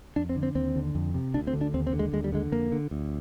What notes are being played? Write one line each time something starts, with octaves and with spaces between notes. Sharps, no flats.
F2 D4
C4
D3
C4
D#2 C4
D3
F2
C3
D2 D4
C4
D3
D4
D#2 C4
C4
D3
G#3
D#2 G#3
G3
D3 G#3
F2 A#3
D3
D2